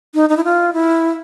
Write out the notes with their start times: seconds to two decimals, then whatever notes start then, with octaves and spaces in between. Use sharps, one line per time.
0.14 D#4
0.29 D#4
0.37 E4
0.44 F4
0.73 E4